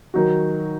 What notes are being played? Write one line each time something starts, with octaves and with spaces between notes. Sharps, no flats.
D#3 F#3 D#4 F#4